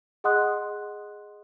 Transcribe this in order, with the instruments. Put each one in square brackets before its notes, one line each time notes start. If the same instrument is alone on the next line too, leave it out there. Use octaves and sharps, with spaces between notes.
[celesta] G#4 D#5 F#5 C6 D#6 F#6